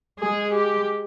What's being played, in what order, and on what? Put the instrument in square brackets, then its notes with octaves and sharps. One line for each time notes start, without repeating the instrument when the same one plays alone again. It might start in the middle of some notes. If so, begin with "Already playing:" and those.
[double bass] G#3 [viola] G#4
[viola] G4